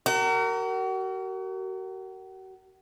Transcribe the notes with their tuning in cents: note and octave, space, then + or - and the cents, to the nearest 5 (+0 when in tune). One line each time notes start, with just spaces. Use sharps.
F#4 +40 A#4 -20